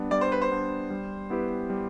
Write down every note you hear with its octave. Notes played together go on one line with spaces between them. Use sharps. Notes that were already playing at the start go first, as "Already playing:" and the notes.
Already playing: G3 B3 D4
G3 D5
C5
B4
C5
B3 D4
G3
B3 E4 G4 B4
G3